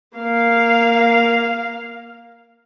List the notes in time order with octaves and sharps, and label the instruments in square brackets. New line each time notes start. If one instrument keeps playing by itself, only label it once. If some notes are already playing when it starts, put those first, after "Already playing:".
[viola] A#3 F5